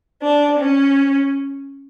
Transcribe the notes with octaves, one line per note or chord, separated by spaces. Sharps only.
D4
C#4